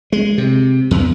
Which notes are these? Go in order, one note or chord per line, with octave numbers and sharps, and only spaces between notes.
G#3
C3
E2